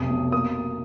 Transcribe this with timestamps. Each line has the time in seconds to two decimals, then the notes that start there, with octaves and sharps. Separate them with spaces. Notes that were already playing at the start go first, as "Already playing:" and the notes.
Already playing: F1 B1 D#6
0.10 B2
0.32 A#3 D#6